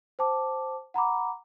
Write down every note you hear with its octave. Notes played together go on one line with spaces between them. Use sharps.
C5 G5 A5 D6
F#5 A#5 B5 D6